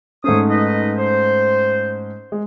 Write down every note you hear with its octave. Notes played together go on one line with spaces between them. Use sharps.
G#2 A3 C#4 C5 C#5 D#6
D#4 B4 D#5
C5
G#3